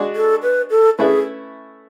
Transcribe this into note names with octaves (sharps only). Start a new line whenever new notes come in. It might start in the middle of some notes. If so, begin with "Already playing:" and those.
Already playing: G#3 D4 F#4
A4
B4
A4
A3 C#4 E4 G#4 B4 E5